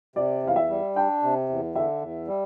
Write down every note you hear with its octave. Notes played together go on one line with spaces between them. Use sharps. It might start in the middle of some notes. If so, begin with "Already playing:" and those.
C3 D5
E2 F5
E5
G3
D4 G5
C3
E2
D3 E5
E2
G3